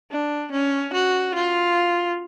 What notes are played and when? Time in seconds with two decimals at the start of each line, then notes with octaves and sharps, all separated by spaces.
0.11 D4
0.52 C#4
0.93 F#4
1.35 F4